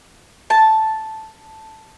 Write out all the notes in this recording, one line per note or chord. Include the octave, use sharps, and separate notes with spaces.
A5